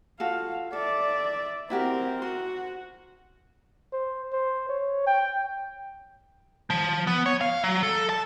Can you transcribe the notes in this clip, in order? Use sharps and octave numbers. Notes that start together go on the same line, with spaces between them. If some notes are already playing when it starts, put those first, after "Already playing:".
F4 F#4 A4 F5
A4 D5 E5
C4 E4 F#4 G4 A#4
F#4 C6
C5
C5
C#5
G5
F3
B3
C#5
F5
F#3
A4
A5